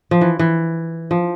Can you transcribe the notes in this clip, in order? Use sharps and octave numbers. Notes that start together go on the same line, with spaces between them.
F3
E3
E3
F3